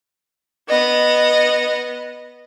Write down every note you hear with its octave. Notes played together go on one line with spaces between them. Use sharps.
B3 D#5